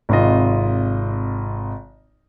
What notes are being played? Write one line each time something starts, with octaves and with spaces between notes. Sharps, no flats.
G#1 C3 F4 D#5